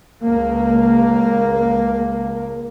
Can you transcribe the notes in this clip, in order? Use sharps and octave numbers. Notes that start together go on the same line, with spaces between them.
C#2 A#3